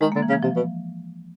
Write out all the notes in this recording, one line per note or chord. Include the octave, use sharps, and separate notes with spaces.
D#3 G#3
A#3
D3
E3
C#3
E3
C3 F3
B2